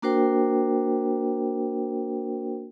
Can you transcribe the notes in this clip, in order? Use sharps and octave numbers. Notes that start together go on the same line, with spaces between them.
A#3 D4 F#4 A#4 C5 G5